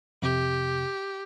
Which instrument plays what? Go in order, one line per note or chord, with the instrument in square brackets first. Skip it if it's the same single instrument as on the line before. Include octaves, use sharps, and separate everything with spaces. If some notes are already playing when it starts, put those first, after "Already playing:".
[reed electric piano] F2 C3 [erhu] G4